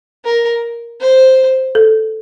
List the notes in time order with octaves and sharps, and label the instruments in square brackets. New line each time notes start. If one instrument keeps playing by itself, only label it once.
[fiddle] A#4
C5
[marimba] A4